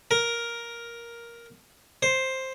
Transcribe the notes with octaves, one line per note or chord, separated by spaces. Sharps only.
A#4
C5